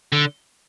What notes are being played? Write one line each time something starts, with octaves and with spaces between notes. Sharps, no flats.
D3